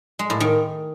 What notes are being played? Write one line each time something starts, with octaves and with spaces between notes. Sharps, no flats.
G#3
A2
D#3